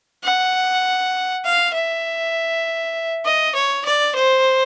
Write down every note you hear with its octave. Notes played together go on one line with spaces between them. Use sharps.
F#5
F5
E5
D#5
C#5
D5
C5